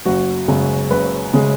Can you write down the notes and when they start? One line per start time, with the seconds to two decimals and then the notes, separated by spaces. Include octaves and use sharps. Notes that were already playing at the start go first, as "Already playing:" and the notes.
0.06 F#1 F#4
0.48 F#2 C#3 G#3
0.91 F#1 B4
1.34 C#3 G#3